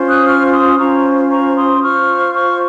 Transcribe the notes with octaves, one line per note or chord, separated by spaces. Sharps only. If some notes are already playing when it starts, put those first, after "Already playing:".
Already playing: C#4 F4 C5
D#6 F#6
C#6 F6
F6
C6 D#6
C#4 F4 C5 A#5 C#6
A#5 C#6
C6 D#6
F4 C5 C#6 F6
C#6 F6